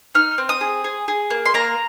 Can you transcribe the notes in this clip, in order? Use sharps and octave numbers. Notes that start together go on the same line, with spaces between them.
D#4 F6
C4
D#6
G#4
G#4
G#4
A#3
C6
A#3 A#5